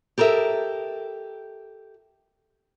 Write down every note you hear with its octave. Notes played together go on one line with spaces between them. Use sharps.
G4 A4 A#4 D#5 E5